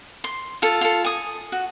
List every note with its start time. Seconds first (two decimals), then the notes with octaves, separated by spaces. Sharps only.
0.24 C6
0.62 F4 A4
0.81 F4 A4
1.04 G#5 D#6
1.52 F#4